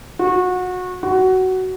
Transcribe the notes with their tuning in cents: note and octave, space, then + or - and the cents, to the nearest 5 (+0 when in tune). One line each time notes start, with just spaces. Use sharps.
F#4 -25
F#4 +15